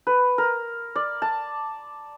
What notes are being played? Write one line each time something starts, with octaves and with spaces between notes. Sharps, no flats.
B4
A#4
D5
A5